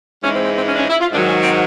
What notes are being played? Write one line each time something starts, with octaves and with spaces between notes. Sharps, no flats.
G#2 E3 G#3 C#4
C4
C4
C4
C#4
D4
C#4
E4
F4
G#2 D#3 F#3 D4
C#4
C4